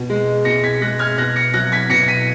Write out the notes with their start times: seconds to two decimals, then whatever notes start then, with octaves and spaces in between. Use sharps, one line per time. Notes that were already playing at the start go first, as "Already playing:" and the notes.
Already playing: B2
0.10 G#3
0.45 B2 A#6 C#7
0.63 G#6 B6
0.82 G#3 F#6 A#6
0.99 F6 G#6
1.18 B2 F#6 A#6
1.36 A#6 C#7
1.54 F#3 F#6 A#6
1.72 G#6 B6
1.90 B2 A#6 C#7
2.08 B6 D#7